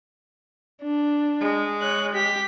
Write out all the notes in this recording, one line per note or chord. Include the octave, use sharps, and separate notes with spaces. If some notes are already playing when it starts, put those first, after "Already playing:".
D4
G#3
C#5 F#6
G4 B6